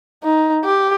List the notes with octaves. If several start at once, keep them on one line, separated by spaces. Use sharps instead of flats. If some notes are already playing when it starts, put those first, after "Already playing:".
D#4
G4